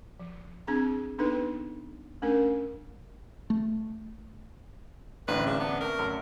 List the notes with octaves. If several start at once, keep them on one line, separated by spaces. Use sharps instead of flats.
F3
C4 D4 G#4 A#5
B3 D4 D#4 A4 B4
A3 C#4 D4 A#4
A3
A1 D2 C4 B4
C#3 D5
B3 D4
A3 A#4
F#2 A4